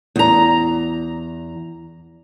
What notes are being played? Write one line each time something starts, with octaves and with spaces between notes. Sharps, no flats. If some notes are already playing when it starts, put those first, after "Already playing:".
E2 A#5